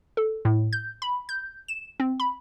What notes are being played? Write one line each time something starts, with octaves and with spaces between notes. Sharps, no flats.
A4
A2
G6
B5
G6
E7
C4
B5